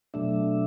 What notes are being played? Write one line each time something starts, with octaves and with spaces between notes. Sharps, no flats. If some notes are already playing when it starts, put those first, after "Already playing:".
B2 F#3 A3 D4 E5